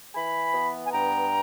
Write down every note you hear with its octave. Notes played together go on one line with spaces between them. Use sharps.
E3 G#5 B5
B3
G#5
G2 G5 A#5